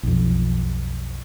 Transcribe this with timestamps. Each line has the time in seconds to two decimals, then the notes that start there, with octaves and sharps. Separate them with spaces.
0.03 B1 F2